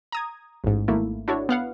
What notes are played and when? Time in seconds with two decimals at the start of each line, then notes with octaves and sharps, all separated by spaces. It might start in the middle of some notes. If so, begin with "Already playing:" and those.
0.12 A#5 D#6 G#6
0.64 A1 G#2
0.88 G#1 A3 A#3 E4
1.28 D4 E4 F#4 A4 C#5
1.49 B3 F5 F#5